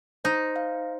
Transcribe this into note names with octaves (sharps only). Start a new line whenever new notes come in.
D#4 C5
F5